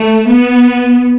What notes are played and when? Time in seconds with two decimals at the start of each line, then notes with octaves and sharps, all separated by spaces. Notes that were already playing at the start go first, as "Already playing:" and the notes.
Already playing: A3
0.26 B3